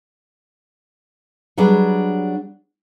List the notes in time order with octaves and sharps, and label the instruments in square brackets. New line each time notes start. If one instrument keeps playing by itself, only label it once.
[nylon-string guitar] F#3 G3 B3 D4 G#4